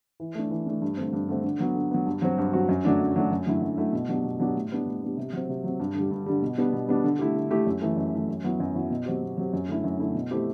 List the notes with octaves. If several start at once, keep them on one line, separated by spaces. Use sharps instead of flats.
E3
A3 D4
E3
A3 D4
G2
D3 A3 C4
G2
D3 A3 C4
D3
F#3 B3
D3
F#3 B3
G2
F#3 C4 F#4
G2
F#3 C4 F#4
F#2
D3 F#3 A3 D4
F#2
D3 F#3 A3 D4
F#2
D3 F#3 A3 E4
F#2
D3 F#3 A3 E4
B2
F#3 B3 D4 G4
B2
F#3 B3 D4 G4
A2
G3 B3 D4
A2
G3 B3 D4
C3
F#3 C4
C3
F#3 C4
G2
D3 G3
G2
D3 G3
B2
G3 B3 D4
B2
G3 B3 D4
D3
A3 E4 G4
D3
A3 E4 G4
F#2
E3 A3
F#2
E3 A3
F#2
F#3 B3 E4
F#2
F#3 B3 E4
B2
F#3 C4 G4
B2
F#3 C4 G4
F#2
D3 A3 E4
F#2
D3 A3 E4
B2
A3 C4 E4 G4